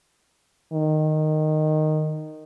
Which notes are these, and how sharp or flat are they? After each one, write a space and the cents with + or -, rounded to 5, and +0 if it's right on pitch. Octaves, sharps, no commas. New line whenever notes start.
D#3 -10